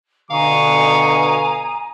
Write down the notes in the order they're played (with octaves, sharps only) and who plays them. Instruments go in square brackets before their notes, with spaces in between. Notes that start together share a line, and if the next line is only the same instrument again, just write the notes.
[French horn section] B2 D3 [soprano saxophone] F5 [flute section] G#5 A#5 D#6 [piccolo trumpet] C#6